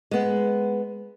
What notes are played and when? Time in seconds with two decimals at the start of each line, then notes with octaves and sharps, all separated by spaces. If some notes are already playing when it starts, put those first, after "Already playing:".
0.11 G#3 B3